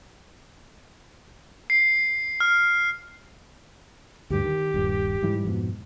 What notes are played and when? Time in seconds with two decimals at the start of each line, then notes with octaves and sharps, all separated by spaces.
1.70 C7
2.40 F6
4.30 D2 G2 G4
4.44 D#3
4.74 D#1 G2
5.23 G#2 E3 G3
5.44 F2 G#2 B2